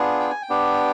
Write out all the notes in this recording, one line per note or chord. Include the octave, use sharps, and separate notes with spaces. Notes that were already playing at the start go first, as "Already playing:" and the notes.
Already playing: B3 D4 F4 G#4
G5
G#5
G5
B3 D4 G4